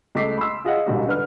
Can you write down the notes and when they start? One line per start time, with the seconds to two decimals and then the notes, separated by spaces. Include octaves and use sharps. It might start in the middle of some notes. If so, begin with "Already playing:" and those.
0.15 C#2 A3 D#5 D6 B6 C7
0.38 B5 C6 E6
0.65 F4 G#4 D#5 F5 F#5
0.86 E1 C#2 G#2 G3 F#4
1.07 D3 B4 F6